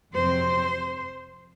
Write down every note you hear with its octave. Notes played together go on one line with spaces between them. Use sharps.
F2 C3 F#3 C4 C5